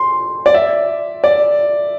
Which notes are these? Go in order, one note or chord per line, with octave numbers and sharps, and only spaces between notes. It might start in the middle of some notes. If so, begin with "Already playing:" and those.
Already playing: C6
D5
E5
D5